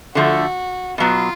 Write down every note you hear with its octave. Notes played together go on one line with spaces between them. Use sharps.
D3 F3 A3 F#4
B2 F#3 B3 F4